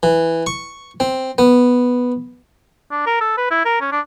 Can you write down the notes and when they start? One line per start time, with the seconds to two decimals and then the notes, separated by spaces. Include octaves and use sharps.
0.03 E3
0.47 C#6
1.00 C4
1.38 B3
2.91 D4
3.06 A#4
3.21 A4
3.37 B4
3.51 E4
3.65 A#4
3.81 C#4
3.92 D4